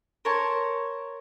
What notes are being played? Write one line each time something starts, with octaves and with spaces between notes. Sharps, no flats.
A#4 C5 C#5 A5